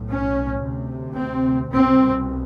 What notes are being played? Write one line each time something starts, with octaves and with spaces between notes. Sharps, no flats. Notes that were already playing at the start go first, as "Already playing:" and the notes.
Already playing: B1 A2
C#4
D2 C3
C4
C2 B2 C4